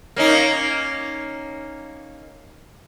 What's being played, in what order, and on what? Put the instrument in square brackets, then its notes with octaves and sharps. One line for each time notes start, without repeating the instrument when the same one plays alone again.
[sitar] A#3 C#4 D#4